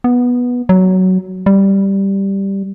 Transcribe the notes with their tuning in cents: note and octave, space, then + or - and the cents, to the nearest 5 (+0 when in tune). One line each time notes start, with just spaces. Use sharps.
B3 -10
F#3 +10
G3 +0